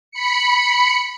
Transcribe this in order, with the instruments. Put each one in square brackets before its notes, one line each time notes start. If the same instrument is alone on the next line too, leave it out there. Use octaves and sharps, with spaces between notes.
[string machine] B5 C#7